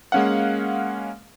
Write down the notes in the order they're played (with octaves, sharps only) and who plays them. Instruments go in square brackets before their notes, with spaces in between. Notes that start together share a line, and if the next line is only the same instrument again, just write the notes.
[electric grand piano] G#3 A#3 C#4 F5 F#5